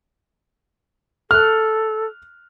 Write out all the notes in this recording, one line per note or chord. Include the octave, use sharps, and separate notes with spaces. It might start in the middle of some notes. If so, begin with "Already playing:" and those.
A4 F6 F#6